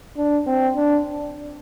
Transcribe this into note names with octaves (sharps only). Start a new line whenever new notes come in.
D4
C4
D4